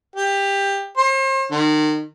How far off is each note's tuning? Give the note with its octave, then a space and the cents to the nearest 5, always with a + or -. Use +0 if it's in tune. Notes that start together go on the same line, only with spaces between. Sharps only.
G4 +15
C5 +40
D#3 -30